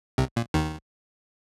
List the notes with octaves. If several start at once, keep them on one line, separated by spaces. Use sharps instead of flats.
C2 C3
A#2
D#2 D#3